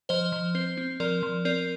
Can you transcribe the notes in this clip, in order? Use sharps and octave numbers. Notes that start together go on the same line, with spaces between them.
F3 C5 D#5
F3
C4 C5
C4
F3 A#4 D5
F3
C4 A#4 D5